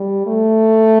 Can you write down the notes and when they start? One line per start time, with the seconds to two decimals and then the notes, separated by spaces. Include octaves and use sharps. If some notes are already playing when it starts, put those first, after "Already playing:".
Already playing: G3
0.26 A3